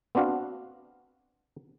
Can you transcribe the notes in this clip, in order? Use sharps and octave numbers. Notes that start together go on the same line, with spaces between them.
B3 C4 D4 F#4 F5